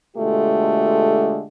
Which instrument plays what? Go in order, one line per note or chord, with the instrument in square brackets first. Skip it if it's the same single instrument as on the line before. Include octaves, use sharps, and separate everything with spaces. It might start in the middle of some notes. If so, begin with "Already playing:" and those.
[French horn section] B2 D3 G#3 A3 F4 G4